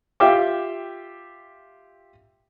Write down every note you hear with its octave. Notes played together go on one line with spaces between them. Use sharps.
F4 G4 E5 F5 G5 D6